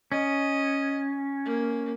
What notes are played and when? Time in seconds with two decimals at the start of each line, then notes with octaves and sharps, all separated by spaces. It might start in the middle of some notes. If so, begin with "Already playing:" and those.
0.12 C#4 D#5
1.45 A#3